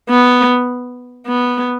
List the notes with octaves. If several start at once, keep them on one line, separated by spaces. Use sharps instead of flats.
B3
B3